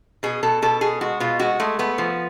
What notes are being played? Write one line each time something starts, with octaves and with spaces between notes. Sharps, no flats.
B2 G#4
B2 A4
B2 A4
B2 G#4
G#3 F#4
B2 F4
G#3 F#4
G#3 A3
A3 B3
F3